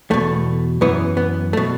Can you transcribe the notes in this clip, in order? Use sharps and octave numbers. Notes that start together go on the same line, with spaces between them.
E2 B2 A3
F#2 E3 B3
B3
B2 A3